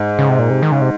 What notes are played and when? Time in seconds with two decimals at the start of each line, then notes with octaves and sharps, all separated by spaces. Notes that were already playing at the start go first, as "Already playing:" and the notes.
Already playing: G#2
0.19 C#3
0.29 C3
0.39 A#2
0.50 C3
0.62 D#3
0.72 C#3
0.81 C3